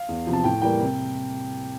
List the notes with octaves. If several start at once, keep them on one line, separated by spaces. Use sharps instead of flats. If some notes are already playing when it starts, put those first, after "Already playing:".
Already playing: F5
E2
C3 F3
A5
A2 G5
E3 G3 A#3 G5
C3